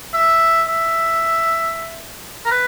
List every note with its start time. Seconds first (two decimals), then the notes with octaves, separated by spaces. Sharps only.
0.13 E5
0.68 E5
2.45 A#4
2.51 B4